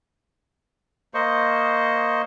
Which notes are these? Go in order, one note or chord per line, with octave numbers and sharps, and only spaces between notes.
A#3 C5 D#5 C#6